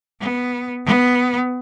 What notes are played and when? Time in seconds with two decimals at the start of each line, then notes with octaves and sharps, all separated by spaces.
0.21 B3
0.87 B3